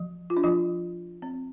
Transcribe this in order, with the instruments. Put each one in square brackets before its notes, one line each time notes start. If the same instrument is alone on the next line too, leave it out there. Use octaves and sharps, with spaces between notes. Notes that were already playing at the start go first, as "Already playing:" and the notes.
Already playing: [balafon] F3
F4
D4
F3 F4
C4